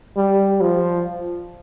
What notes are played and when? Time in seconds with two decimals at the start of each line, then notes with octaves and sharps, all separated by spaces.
0.17 G3
0.61 F3